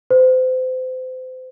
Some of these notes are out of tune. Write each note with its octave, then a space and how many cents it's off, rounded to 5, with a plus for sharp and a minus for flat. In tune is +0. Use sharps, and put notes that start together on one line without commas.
C5 -30